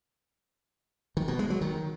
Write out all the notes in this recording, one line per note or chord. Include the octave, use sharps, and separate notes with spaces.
D#3
B2
G#3
F#3
D#3